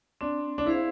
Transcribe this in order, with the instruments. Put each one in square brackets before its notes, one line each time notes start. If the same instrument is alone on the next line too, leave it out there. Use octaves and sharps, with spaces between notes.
[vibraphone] C4 [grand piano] D4
[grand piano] D4
[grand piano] E4 [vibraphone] G#4 C5 F5